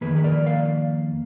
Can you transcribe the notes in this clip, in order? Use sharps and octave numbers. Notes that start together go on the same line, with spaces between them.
F2 D#3 A#3 G#4 B4
B4
A#4 D5
D5 F5